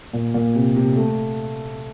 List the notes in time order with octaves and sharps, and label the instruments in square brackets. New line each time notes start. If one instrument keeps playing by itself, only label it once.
[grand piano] A#2
A#2
C3
C3
A3